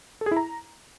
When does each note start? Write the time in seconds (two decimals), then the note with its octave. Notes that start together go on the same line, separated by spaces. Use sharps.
0.21 A4
0.26 G#4
0.31 E4
0.37 A#5